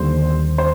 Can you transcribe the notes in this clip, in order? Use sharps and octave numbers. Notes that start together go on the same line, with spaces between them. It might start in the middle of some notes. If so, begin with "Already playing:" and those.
Already playing: D#2 D3 G3 A#3 C5
C5